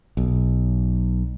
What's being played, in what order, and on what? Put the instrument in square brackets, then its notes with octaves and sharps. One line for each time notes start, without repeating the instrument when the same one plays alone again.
[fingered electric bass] B1